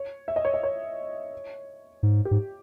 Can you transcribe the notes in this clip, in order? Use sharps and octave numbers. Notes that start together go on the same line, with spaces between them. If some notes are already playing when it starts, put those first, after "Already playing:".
Already playing: C#5
E5
D#5
C#5
D#5
C#5
G#2
G4
G#2